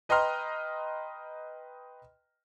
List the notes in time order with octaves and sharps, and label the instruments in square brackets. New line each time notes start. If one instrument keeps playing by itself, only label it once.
[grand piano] B4 D#5 G5 A#5 C6 F6